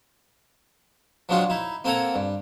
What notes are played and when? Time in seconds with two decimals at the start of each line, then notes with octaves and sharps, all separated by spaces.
1.29 F3 F#3 G#3 D4 F4 F#4
1.50 D#4 E4
1.84 A#3 C4 A4 F#5 G#5 A#5
2.14 G2